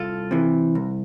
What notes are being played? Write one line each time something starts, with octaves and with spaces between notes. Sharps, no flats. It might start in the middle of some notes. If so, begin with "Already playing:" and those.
Already playing: C2 F4 A4
C3 E3
C2